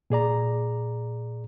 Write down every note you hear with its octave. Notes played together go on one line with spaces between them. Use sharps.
A#2 G#4 D5 A#5